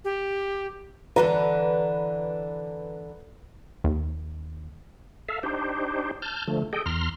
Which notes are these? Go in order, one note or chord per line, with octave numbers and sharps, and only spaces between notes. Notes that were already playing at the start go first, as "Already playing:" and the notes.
G4
D3 E3 A4 B4 A#5
D#2
A4 E5 F5
D4 D#4 G4 C5
A5 F6 G6
D3 F3 A3
G#4 A4 D#5 G5
E2 A#5 C6 F6